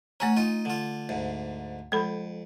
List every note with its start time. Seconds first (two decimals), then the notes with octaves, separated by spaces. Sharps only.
0.20 A3 C#4 F#4 G#5 A#5
0.37 D#4 F4
0.65 D3 F4
1.09 D2 G#2
1.92 F2 G#3 A4 B5